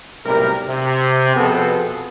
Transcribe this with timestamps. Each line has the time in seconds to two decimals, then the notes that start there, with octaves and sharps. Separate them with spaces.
0.25 B1 A2 C3 G3 A#4
0.68 C3
1.35 F2 B2 B3 C4 G#4 A4